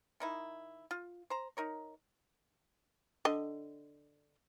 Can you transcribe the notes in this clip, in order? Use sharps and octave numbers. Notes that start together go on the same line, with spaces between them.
D#3 D#4 E4
F4
C5 A#5
D#4 A#4 C#5
D3 D#5